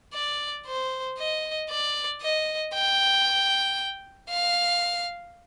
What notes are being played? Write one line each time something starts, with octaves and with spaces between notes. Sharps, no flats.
D5
C5
D#5
D5
D#5
G5
F5